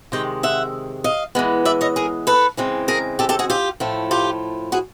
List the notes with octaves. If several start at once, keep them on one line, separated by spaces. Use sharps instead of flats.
C3 D#3 G#3 G5
E5 F#5
D#5 F5
E3 G#3 B3
D5 E5
C#5 D#5
G#4 A#4
A4 B4
C#3 E3 G#3 C4
G#4 A#4
G4 A4
G4 A4
F#4 G#4
F4 G4
A2 F3 A3
F4 G4
F#4 G#4